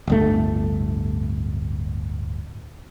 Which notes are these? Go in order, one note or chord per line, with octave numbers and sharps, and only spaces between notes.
D1 G1 A3